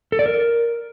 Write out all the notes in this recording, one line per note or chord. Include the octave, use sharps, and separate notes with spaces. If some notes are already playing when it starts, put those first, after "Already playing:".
A4
D5
A#4